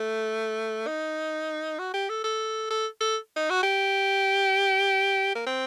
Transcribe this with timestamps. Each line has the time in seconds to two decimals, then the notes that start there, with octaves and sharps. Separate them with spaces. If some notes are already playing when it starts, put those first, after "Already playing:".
Already playing: A3
0.87 D#4
1.79 F#4
1.94 G4
2.09 A4
2.24 A4
2.71 A4
3.01 A4
3.36 D#4
3.50 F#4
3.63 G4
5.35 A#3
5.47 C4